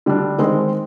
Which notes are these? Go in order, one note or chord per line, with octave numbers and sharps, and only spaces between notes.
D3 G3 D4
D#3 G#3 C4